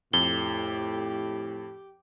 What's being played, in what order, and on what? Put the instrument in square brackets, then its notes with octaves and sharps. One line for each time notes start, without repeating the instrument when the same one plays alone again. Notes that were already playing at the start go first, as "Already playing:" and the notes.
[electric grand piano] F2 [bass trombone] A2 [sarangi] G4 [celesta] G7